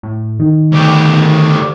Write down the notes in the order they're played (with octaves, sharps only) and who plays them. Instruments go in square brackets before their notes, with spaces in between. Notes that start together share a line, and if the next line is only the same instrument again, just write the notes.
[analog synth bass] A2
D#3
[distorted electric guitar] D2 G4